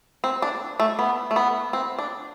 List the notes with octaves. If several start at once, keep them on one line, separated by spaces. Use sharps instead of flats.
C4
D4
A3
B3
A3
B3
C4
D4